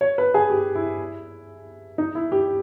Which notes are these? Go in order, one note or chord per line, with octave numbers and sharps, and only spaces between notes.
C#5
B4
G#4
G4
E4
D#4
E4
G4